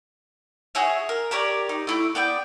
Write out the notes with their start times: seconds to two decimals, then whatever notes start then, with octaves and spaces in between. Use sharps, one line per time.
0.75 F#4 G#4 C#5 E5
1.09 A#4
1.31 G4 A#4 C#5 D5
1.69 D#4
1.87 A3 E4 D6
2.15 B3 D5 G5